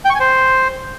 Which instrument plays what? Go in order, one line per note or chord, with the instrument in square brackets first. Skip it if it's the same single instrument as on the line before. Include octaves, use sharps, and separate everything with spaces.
[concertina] G5
C#6
G#5
C5